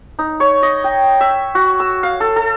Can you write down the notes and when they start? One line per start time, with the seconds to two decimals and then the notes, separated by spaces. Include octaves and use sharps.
0.19 D#4
0.40 C#5
0.63 D#5
0.84 G5
1.20 E5
1.55 F#4
1.80 E6
2.03 F5
2.20 A4
2.36 A4